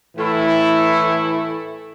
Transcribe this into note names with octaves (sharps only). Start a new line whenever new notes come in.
A2 E3 A3 E4